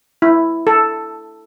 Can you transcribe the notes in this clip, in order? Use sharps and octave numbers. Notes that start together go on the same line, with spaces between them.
E4
A4